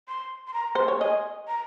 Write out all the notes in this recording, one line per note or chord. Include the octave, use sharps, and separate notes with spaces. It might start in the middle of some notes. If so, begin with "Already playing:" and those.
C6
C6
A#5
C5
C#5
D#5 G#5
A#5